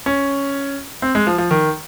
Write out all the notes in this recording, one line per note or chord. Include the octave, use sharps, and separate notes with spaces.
C#4
C4
G#3
F3
F3
D#3